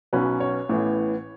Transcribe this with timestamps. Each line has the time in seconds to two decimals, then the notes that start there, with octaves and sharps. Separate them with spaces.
0.13 B1 B2 F#3 C#4 B4
0.40 C#5
0.69 A1 A2 E3 B3